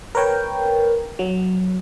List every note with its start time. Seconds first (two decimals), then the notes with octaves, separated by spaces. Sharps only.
0.15 A#4 B4 C#5 G5
1.19 F#3